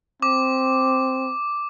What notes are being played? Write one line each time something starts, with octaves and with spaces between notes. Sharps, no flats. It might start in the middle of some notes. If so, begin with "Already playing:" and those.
C4 D6